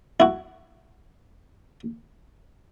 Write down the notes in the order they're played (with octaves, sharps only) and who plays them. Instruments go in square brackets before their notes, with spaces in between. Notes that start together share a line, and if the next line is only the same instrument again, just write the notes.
[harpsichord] E4 F#4